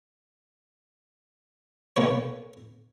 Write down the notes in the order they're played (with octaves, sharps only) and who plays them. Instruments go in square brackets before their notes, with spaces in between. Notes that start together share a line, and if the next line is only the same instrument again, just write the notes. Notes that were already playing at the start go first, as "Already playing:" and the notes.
[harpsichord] B1 A#3 B4 C#5